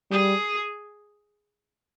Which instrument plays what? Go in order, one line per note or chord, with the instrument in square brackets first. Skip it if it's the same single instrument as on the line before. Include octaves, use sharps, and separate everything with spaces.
[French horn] G3 [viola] G#4